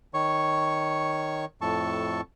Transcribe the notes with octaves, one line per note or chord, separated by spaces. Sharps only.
D#3 C#5 C#6
F2 A2 A4 A5 C#6